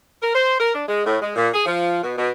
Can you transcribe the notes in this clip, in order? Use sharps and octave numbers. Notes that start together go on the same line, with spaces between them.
A#4
C5
A#4
D4
G#3
A2
G#3
A#2
G#4
F3
B2
B2